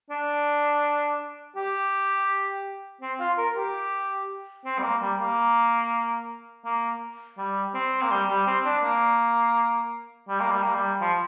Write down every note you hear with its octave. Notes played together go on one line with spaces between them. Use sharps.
D4
G4
C4
F4
A#4
G4
C4
G3
A#3
G3
A#3
A#3
G3
C4
A#3
G3
G3
C4
D4
A#3
G3
A#3
G3
A#3
G3
F3